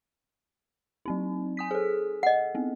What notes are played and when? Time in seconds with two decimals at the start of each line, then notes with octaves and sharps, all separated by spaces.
1.05 F#3 C4 D#4
1.57 G#5 D#6 B6
1.71 G#4 A4
2.23 D#5 F#5
2.55 B3 C4